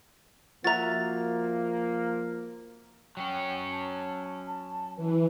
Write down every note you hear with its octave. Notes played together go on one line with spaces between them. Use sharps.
F3 A#3 F#4 A#4 E5 A#5 A6
F#3 C#4 G5
A5
A5
E3 B4